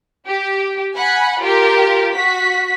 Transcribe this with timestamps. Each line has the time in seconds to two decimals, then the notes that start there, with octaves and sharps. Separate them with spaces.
0.28 G4
0.96 F#5 G#5 B5
1.42 F4 G4 A#4
2.15 F#4 B6